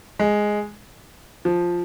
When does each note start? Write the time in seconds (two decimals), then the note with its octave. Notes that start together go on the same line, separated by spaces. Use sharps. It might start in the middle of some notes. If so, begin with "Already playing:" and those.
0.19 G#3
1.45 F3